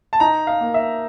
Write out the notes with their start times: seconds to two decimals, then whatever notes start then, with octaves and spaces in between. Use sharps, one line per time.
0.13 A5
0.20 D#4 A#5
0.47 F5
0.61 A#3
0.74 E5